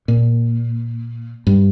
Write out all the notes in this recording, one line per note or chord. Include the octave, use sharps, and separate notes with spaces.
A#2
G2